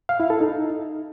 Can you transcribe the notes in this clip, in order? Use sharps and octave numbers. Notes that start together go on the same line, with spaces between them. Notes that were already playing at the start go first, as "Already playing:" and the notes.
F5
E4
A4
D#4